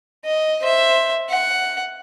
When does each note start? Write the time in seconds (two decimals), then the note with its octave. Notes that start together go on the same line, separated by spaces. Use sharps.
0.25 D#5
0.62 C5 E5
1.29 F#5